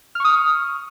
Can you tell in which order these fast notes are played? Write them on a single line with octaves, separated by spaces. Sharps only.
F6 C#6 D#6